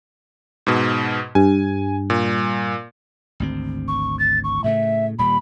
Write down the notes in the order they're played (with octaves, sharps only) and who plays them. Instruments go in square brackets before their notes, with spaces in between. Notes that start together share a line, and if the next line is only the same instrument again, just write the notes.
[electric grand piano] G#2 B2
[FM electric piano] G2 [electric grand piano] G#5
[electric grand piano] A#2
[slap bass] G#1 D2 C4
[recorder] C#6
A6
C#6
[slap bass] A2 C#3 A3 [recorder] E5
[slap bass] D#1 A#2 G3 [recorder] B5